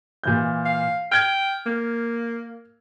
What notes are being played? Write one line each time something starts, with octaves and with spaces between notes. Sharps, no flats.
A#2 E3 G6
F5
G5 F6 G#6
A#3